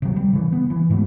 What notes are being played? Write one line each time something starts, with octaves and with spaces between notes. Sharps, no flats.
C3 F#3
G3
C#3 E3
B3
E3
G#2 B2 G#3 A3